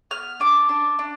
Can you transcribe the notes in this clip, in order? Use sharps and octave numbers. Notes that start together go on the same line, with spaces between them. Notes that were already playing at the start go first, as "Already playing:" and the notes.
B3 F6
D4 D6
D4
D4